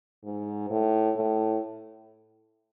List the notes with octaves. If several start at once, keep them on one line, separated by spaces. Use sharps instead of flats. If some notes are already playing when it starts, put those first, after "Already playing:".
G#2
A2
A2